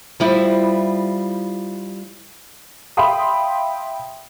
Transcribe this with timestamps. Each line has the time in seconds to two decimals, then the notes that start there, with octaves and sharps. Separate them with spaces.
0.20 F3 G3 E4
2.97 E5 F5 G5 B5 C6 D#6